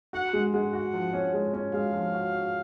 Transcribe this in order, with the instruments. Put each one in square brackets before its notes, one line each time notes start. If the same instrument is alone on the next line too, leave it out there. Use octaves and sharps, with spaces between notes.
[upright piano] F#4 [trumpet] F#5
[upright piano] G#3
[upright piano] G#3 [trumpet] F#5
[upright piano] F#4
F3
C#4
G#3
C#4
[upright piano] G#3 [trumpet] F5
[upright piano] F3
F#4
F#4